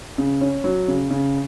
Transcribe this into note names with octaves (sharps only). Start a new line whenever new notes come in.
C#3
C#4
F#3
C#3
C#3